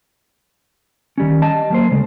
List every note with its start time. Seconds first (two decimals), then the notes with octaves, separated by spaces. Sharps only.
1.18 D#3 G3 C#4
1.42 D#5 A5
1.70 F#3 A#3 C5
1.91 C#3 G#3 A3